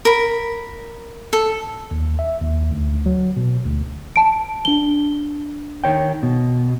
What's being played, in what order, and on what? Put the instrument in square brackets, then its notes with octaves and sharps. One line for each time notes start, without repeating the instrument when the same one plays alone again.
[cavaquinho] A#4 B5
A4
[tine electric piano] D#2
E5
D#2
D2
F#3
B2
D2
[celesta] A5 D7
D4 G7
[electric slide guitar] D#3 C#5 G5
B2